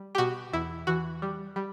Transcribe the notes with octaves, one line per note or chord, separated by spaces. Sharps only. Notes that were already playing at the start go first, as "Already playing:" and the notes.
Already playing: G3
G4
B2 F#4
E2 E4
E3 F#4
G3
G3